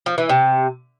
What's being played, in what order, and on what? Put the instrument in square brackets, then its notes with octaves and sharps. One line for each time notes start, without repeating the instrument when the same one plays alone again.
[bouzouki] F3
E3
C3